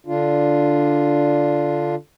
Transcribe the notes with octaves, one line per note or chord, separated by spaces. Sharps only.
D3 D4 F4